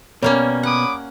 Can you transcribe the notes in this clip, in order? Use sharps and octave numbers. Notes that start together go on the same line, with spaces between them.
B2 G3 A#3 B3 C#4 C#5
F#5 B5 D6 D#6